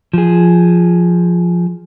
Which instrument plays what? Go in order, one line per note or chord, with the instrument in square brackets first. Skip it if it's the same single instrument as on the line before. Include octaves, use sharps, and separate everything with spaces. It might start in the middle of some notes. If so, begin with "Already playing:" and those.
[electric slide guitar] F3 G#4